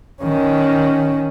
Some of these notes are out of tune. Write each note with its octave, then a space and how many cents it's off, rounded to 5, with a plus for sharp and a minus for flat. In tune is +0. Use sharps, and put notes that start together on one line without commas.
D#3 +0 C#4 +0